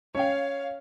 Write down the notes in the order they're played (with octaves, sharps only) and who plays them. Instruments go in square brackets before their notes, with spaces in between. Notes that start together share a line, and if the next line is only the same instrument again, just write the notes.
[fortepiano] C#4 G5 [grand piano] C#5 [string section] F5